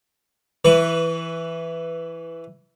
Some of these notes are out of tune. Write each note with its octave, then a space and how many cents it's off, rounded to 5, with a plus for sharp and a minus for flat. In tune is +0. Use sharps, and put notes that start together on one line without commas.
E3 +5 B4 +0 C#6 +35